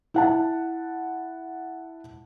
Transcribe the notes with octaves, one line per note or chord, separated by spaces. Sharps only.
E4 F#5 A5